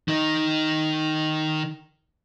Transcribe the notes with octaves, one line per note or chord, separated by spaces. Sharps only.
D#3 D#4